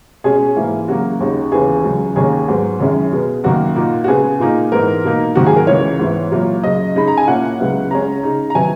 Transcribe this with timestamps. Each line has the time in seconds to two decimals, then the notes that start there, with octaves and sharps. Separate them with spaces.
0.24 B2 G#3 C#4 G#4
0.56 G#2 E3 A#3 E4
0.88 C#3 F#3 A#3 F#4
1.20 D#2 C#3 G#3 D#4
1.52 D#2 C#3 E3 B3 G#4
1.84 C#2 C#3 F#3
2.16 D#2 D#3 A#3 C#4 G#4
2.48 G#2 F#3 B3
2.80 F#2 D#3 G#3 C#4 E4
3.12 B2 G#3 B3
3.44 F#2 D#3 A#3 F#4
3.76 A#2 A#3 D#4
4.04 F#4
4.08 C#3 G#3 B3 G#4
4.40 A#2 A#3 D#4
4.72 G#2 E3 B3 D#4 A#4
5.04 B2 A#3 D#4
5.35 G#2 D#3 F#3 A#3 F#4
5.46 G#4
5.56 A#4
5.67 C#2 C#3 E3 C#5
5.99 G#2 E3 B3 E4
6.31 A#2 F#3 A#3 E4
6.64 F#2 C#3 F#3 D#5
6.95 C#3 G#3 D#4 B5
7.08 A#5
7.17 G#5
7.27 A#2 A#3 C#4 E4 F#5
7.59 C#2 C#3 F#3 B3 E4
7.91 C#3 G#3 C#4 A#5
8.23 C#3 G#3 D#4
8.50 A#5
8.55 D#3 F#3 B3 E4 G#5